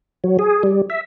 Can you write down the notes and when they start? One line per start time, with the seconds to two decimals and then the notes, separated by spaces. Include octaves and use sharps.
0.24 F#3
0.39 G#4
0.63 G3
0.90 E5